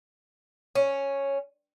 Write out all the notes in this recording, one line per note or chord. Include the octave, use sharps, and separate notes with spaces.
C#4